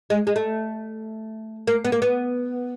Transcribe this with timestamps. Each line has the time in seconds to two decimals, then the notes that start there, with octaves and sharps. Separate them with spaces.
0.10 G#3
0.27 G#3
0.36 A3
1.67 A#3
1.85 B3
1.92 A#3
2.02 B3